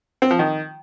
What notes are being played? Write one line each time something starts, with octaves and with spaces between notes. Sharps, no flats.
C4
F3
D#3